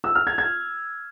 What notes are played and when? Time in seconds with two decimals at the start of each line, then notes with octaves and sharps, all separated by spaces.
0.04 E6
0.15 F6
0.27 G#6
0.38 G#6